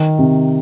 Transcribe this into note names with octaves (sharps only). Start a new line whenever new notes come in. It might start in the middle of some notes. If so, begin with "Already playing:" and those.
Already playing: D#3
C3